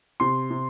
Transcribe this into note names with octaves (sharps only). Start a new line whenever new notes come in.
C3 C6
C3